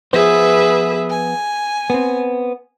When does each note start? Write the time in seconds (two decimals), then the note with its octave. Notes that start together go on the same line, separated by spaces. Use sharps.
0.13 F3 B3 G#4 B4 C5 E5
1.11 G#5
1.90 B3 C4